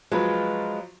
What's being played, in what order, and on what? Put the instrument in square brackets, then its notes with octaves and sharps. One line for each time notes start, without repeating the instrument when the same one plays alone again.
[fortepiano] F3 F#3 [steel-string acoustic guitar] G#3 F4 B4